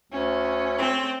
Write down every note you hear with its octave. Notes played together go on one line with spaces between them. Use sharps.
D2 C#4
A3 C4